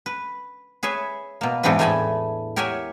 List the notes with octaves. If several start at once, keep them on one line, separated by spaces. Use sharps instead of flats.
B4
G#4 B4 C#5 E5
B2 A#3
E2 G#2 E3 C4 D4 B4
E2 A2 A3 G#5 A5 B5
G4 A#4 C#5 E5 F#5 G#5